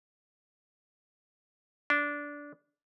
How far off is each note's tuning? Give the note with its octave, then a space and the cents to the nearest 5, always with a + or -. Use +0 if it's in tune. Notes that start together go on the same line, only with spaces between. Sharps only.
D4 -15